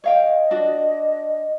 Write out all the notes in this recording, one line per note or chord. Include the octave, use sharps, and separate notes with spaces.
C#5 D#5 F5 G5
D4 F#4